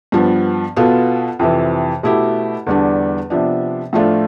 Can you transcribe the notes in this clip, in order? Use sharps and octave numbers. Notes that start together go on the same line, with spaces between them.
G2 F3 B3
B2 B3 F4 A4
F2 C3 E3
B2 A3 E4 G4
E2 D3 G3 D4
C3 F3 B3 D4
A2 F3 A3 D4 F4